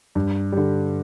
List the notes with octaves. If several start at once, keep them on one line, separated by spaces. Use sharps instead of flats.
G2
D3 G3